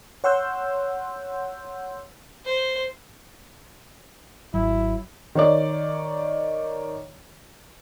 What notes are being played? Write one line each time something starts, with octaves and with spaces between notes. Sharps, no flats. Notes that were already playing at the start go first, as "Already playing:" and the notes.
C#5 F#5 C6 E6 G6
C5
G#1 F#3 E4
D#3 C#5 D5